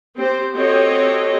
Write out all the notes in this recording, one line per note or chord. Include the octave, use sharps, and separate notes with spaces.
C4 G4 C5
C4 F#4 G4 A4 C#5 D#5